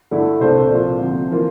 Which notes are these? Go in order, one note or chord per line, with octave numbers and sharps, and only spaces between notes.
G2 D3 A3 E4
C2 A#2 A3 D4 C5
C2 A#2 F3 A#3 F4
D2 C3 F3
E3 A#3 F4